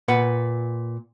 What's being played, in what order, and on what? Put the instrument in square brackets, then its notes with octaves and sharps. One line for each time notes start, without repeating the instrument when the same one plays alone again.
[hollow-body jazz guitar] A#2 B4 F#5